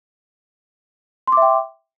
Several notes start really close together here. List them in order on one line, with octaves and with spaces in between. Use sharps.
C6 D6 E5 G5